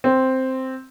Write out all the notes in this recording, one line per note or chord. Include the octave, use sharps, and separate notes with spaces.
C4